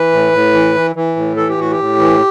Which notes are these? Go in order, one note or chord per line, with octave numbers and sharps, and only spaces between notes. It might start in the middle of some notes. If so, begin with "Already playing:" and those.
Already playing: E3 B4
A2
A2
E3
E3
E3
A2
E3 A4
G4
A2 F#4
G4
A2
E3